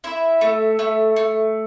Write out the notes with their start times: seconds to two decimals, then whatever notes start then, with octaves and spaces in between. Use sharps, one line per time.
0.04 E4 E5
0.41 A3
0.79 A3
1.16 A3